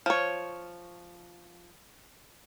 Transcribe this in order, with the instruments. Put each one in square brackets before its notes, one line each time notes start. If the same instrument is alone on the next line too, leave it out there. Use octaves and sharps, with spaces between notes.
[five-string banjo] F3 C#5